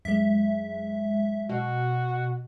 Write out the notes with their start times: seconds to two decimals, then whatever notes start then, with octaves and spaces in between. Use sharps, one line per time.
0.05 F#2 G#3 E5
1.49 B2 F#4